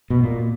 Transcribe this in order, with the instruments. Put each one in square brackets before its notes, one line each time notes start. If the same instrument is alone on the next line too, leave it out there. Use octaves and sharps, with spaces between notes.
[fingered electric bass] B2
A#2